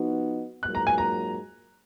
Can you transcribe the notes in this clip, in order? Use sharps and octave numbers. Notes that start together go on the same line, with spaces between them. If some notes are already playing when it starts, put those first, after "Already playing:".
Already playing: F3 B3 D#4 F#4
G#2 F#3 A#3 F4 F#6
A#5
G#5
A#5